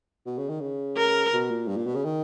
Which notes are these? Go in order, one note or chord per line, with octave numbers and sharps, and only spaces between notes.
B2
C#3
D#3
C#3
A#4
B2
A#2
G2
A#2
B2
C#3
D#3